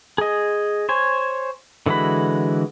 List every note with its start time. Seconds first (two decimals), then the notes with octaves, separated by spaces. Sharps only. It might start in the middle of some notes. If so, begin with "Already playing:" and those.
0.18 G#4 D#5
0.89 C5 C#5 G#5
1.86 D3 E3 G#3 F#4 B5